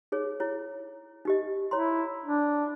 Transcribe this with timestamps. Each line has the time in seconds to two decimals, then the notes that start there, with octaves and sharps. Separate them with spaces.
0.12 D#4 G#4 C#5
0.40 E4 C#5
1.25 D#4 G4 D#5
1.71 E4 C#5 A#5 C6
2.25 D4